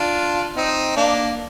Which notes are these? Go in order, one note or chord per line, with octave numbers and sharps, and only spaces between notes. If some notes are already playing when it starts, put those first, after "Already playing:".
Already playing: D4 F4
C4 D#4
A#3 D4